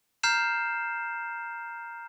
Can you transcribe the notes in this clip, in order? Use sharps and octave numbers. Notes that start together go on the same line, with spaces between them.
A#5 F6 G6 C7 E7